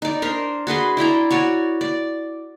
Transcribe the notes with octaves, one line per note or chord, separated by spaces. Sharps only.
D#4 D5
D4 A#4 C5
F#4 G#4 B4 C6
E4 D5 G5 A#5
F#4 C#5 D5
D5